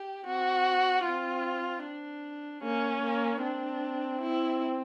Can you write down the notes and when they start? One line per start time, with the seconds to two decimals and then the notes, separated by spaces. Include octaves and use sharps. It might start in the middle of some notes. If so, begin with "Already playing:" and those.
Already playing: G4
0.25 C4 F#4
1.05 C4 F4
1.84 D4
2.63 A#3 C#4
3.02 A#3
3.42 C4 D4
4.21 E4